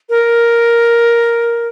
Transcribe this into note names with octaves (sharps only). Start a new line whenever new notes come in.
A#4